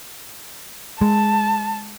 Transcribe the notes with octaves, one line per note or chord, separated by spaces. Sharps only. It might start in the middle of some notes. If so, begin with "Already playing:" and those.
G#3 A5